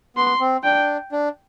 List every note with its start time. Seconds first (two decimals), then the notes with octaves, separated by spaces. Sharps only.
0.16 B3 C6
0.40 C4
0.64 D4 G5
1.12 D4